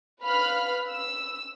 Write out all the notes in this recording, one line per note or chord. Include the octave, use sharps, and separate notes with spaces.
B4 F5 B5 F6
E6